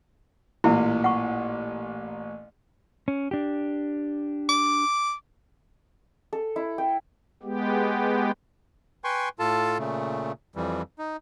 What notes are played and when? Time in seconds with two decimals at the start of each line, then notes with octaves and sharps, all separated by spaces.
0.64 A1 A#2 E4
1.04 F#5 C#6
3.08 C#4
3.31 D4 G4
4.49 D6
6.33 A4
6.56 E4
6.78 G5
7.43 G#3 B3 G4
9.04 B4 G5 G#5 C6 C#6
9.39 A2 F4 A4 A5
9.79 A#2 C#3 A3
10.56 F2 E3 G3
10.99 D#4